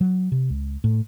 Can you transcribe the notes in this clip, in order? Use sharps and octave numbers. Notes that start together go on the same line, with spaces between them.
F#3
C3
C#2
A2